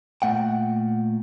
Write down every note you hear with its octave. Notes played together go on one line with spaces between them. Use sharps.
A#2 A3 F#5 G5